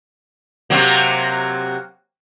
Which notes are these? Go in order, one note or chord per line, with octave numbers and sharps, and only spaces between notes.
C3 F#3 A#3